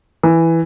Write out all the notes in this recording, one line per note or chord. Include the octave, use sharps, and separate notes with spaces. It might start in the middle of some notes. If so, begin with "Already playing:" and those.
E3